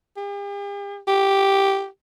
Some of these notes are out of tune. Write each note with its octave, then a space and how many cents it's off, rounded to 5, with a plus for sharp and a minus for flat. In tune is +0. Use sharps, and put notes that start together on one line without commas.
G4 +45
G4 +0